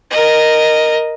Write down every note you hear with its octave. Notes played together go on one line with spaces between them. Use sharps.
A#4 D#5